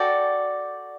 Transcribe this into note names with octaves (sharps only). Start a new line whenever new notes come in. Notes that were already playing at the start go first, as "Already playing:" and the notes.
Already playing: F#4 A4 D5 G5